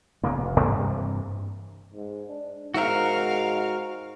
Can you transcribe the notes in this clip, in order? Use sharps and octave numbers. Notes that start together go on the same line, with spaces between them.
A#1 C#3 A#3 B3
F1
G2 C3 E3 A#3
G#2
D4
G#2 F#4 A#4 F5